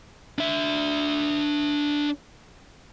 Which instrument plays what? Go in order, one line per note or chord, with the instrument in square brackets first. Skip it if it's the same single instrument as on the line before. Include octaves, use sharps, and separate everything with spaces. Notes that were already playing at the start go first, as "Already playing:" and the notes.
[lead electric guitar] D4 E5